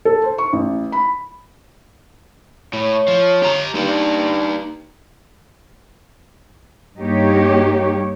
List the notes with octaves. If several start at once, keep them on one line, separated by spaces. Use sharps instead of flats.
A4
C5
C#6
A1
B5
A2 C#5
F3
G4 A#5
G2 D#4 G4
G2 G3 A#3 D#4 G4 C#5